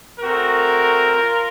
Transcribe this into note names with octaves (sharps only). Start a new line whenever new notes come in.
A3 C4 F#4 A#4
F4